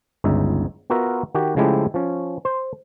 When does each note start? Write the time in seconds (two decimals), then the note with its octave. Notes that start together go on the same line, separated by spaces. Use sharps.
0.24 G1 C#2 C#3 D#4 E5
0.90 B3 F4 F#4 A#4 E5
1.35 D#3 F#4 G4
1.56 C#3 F3 G#3 A3 E4 G4
1.94 F3 C#4
2.45 C5